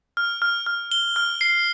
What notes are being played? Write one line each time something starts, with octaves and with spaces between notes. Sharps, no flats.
F6
F6
F6
G7
F6
C7